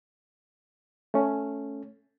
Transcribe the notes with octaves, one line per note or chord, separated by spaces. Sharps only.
A3 C#4